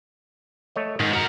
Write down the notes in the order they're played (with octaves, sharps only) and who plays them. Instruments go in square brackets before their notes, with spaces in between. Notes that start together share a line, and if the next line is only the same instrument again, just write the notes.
[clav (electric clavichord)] A3 C#5 D#5
[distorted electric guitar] G#2 [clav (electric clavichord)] D#3
[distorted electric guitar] F#4 A#4